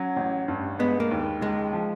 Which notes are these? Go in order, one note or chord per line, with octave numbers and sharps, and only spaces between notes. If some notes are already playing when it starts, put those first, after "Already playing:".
Already playing: F#3 C#4
A1
G2
G#3 B3
A#3
D#2
C#2 G#3
F3